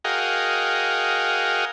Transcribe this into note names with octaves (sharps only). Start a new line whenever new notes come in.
F#4 G#4 A#4 D#5 F5 G5